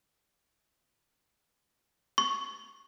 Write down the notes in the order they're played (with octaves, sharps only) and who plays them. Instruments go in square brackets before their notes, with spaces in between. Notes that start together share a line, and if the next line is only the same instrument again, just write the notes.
[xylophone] C#6